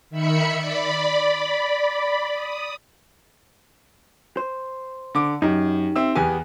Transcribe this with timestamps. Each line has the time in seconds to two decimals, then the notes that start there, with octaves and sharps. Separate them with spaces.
0.10 D#3 E5 B5 C#7
0.58 D5 B5
2.34 D#6
4.37 C5
5.15 D3 D6
5.42 F#2 D#4 G4
5.96 C4 E5 E6
6.15 E2 B3 G4 G#5